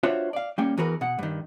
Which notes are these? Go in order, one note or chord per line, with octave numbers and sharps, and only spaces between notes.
D4 F4 F#4 C5 C#5 E5
D5 F5
G3 A#3 C#4 G5
E2 E3 F#4 A#4 B4
B2 F#5
G2 D#3